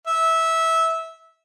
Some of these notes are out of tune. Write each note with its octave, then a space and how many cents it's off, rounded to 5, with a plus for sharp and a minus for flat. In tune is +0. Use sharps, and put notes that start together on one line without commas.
E5 -15